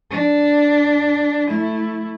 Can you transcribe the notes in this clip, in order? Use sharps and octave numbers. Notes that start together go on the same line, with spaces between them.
D4
A3 E4